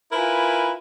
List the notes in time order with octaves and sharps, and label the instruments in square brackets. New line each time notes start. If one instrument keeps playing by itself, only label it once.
[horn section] E4 F4 A#4 B4 G#5